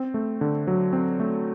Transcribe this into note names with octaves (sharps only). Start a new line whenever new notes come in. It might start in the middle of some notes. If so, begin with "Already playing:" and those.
Already playing: C4
A3
D3
F#3
C4
A3